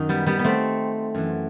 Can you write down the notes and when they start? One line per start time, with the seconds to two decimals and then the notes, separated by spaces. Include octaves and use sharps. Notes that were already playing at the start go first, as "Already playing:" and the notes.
Already playing: F#2 D#3 D#4
0.09 G3 B3
0.27 G3 B3
0.39 B3
0.44 A3 C4
1.15 F#2 E3